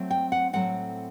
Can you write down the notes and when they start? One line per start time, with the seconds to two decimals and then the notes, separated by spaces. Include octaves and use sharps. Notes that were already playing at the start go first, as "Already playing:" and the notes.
Already playing: F#3 A3 C4
0.11 G5
0.32 F#5
0.53 A2 F#3 A3 C4 F#5